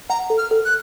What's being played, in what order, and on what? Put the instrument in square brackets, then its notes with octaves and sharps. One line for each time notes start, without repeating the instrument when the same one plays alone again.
[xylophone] F#5 [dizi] A#5
[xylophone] A4
[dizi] F6
[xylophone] A4
[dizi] F#6